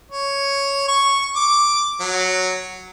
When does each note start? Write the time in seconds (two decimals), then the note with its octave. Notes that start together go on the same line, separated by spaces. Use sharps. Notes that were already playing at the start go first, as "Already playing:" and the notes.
0.11 C#5
0.88 C#6
1.36 D6
2.00 F#3